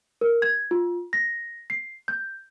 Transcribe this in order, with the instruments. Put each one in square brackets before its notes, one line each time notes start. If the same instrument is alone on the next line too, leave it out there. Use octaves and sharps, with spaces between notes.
[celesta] A#4
G#6
F4
A#6
C7
G6